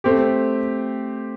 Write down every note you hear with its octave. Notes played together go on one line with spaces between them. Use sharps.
A3 C4 G4